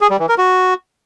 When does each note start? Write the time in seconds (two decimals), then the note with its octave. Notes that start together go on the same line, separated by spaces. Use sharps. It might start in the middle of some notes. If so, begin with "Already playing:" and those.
0.01 G#4
0.10 G3
0.20 E3
0.29 A#4
0.38 F#4